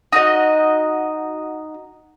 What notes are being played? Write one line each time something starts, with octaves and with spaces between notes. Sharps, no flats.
D#4 F#4 D#5